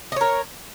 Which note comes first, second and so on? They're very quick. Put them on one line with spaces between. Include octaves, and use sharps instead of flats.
D#5 C#5 A#4